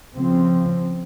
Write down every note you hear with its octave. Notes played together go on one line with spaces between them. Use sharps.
C#3 F3 C4